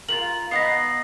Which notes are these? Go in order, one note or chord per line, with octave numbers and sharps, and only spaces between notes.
F4 G4 A#4 F#7
B3 D#4 F#5 A#6 C7